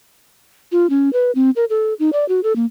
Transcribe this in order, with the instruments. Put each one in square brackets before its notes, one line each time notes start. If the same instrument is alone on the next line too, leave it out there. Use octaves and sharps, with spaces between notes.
[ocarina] F4
C#4
B4
C4
A#4
A4
D#4
D5
F#4
A4
A#3